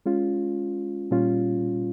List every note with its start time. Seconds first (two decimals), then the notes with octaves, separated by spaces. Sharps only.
0.06 G#3 C#4 F4
1.11 A#2 G3 C#4 F4